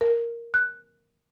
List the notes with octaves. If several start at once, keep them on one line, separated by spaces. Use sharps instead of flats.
A#4
F#6